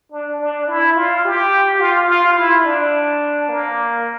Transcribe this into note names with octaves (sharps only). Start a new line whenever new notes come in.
D4
D4
E4
F4
G4
F4
F4
E4
D4
A#3